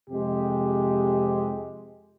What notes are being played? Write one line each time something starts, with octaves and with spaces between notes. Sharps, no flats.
F2 C3 G#3 G4